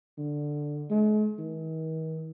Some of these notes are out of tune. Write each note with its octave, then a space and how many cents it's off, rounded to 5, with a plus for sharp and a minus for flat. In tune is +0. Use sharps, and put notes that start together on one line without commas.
D3 +5
G#3 +45
D#3 +45